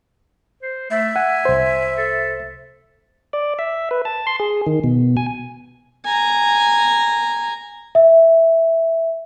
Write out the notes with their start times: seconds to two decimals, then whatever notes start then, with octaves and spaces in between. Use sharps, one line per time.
0.63 C5
0.91 A3 E5
1.16 F#5 G#5
1.45 C2 C5
1.98 A4
3.33 D5
3.59 E5
3.91 B4
4.05 A5
4.27 C6
4.40 G#4
4.66 D#3
4.84 B2
5.17 G#5
6.05 G#5 A#5
7.95 E5